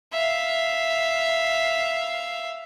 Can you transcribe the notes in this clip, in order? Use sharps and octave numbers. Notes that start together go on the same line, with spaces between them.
E5 F5